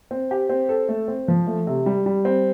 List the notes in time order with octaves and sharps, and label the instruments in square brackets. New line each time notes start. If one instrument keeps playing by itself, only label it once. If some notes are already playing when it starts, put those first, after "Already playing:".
[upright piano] C4
G4
C4
A4
A3
C4
F3
A3
C3
G3
G3
C4